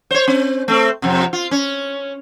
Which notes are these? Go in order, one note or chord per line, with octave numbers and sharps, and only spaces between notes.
C5 C#5
C4
A3 C4
F2 C3
F4
C#4